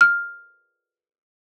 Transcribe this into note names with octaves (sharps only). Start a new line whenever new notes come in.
F6